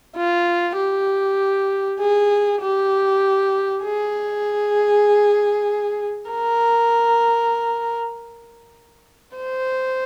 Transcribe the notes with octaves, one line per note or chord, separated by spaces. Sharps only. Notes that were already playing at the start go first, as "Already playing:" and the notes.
F4
G4
G#4
G4
G#4
A#4
C5